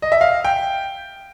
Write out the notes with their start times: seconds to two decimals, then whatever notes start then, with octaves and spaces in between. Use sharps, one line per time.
0.02 D#5
0.12 E5
0.21 F5
0.45 G5